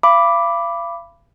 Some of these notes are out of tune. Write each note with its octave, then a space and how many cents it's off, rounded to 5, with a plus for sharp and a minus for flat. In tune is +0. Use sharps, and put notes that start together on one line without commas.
F5 -40 B5 +0 D6 +0